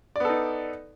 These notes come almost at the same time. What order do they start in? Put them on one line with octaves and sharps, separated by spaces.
D5 B3 A4 D#4